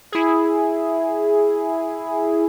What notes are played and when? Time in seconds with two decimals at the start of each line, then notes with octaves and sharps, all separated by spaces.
0.12 E4 G#4